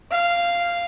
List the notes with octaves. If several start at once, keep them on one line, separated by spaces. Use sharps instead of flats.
F5